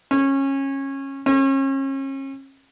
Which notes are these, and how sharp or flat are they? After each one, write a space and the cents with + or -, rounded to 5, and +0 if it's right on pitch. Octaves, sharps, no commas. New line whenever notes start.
C#4 -20
C#4 -35